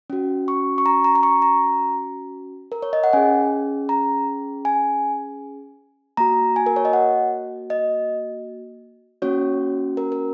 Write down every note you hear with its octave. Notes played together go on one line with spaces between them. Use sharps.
C#4 F#4
C#6
C#6
A#5
A#5
A#5
C#6
A#5
A#4
C#5
D#5
F#5
C#4 G#4 G#5
A#5
G#5
A#3 F#4 A#5
G#5
A#4
C#5
D#5
F#5
D#5
A#3 C#4 F#4 C#5
A#4
A#4